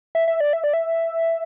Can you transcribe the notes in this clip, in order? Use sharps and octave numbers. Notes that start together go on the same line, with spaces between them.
E5
E5
D5
E5
D5
E5